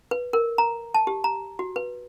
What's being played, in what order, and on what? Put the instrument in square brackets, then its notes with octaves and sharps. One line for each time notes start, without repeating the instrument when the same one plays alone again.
[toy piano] B4
A#4
A#5
A5
G4
A#5
F#4
B4